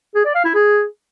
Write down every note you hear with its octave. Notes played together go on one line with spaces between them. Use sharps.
G#4
D5
F5
E4
G#4